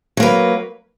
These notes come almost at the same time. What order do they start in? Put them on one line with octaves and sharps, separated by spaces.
F#3 A#3 B4